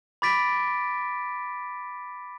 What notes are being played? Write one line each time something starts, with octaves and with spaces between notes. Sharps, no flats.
B5 D6 A6 B6 D7